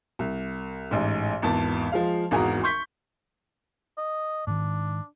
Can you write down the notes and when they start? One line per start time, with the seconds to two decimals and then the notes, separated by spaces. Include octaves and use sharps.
0.19 C2
0.91 A1 G#2
1.42 G#1 E2 A5
1.92 F3 G#3 F5
2.31 G#1 E2 F#4 G#4 A#5 D#6
2.64 C6 C#6 G6 B6
3.98 D#5
4.47 G#2 D#3 D4